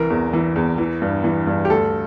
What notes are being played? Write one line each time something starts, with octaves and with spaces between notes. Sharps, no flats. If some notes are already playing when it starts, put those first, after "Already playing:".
Already playing: C2 E3 A#4
E2
E3
E2
E3
G2
E3
G2
G4
D2 A4